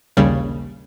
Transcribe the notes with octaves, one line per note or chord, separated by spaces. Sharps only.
A#1 D#2 C#3 G3